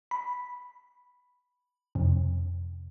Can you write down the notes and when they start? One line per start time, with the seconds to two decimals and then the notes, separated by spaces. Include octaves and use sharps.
0.11 B5
1.95 F2 C3